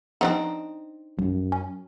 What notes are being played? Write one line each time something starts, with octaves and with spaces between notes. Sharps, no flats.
F3 B3 C4 D4 D#4
B1 F#2
C#4